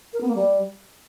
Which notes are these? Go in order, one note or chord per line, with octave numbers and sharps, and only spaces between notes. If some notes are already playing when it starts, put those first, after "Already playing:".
A#4
B3
A#3
G3